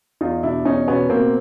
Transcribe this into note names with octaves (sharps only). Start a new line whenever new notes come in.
E2 D#4 F4
B2 D4 E4
E2 C#4 D#4
B2 B3 C#4
B2 A#3 C4